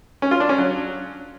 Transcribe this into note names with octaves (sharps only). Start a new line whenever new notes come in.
C#4
F4
D4
C#4
F#3